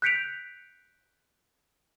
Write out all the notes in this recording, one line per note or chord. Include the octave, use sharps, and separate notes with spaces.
F#6 G6 B6 C#7 D7 F7